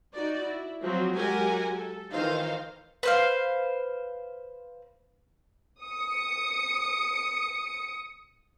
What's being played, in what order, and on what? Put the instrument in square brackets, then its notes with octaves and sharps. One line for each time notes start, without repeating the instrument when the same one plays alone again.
[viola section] D#4 F#4 D5
E4
F3 F#3 C4
F#3 G#3 G4 A#4 F#5 G#5
A4
D#3 E3 D#4 F4 C5 F5
[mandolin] B4 C5 F5
[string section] D#6 C#7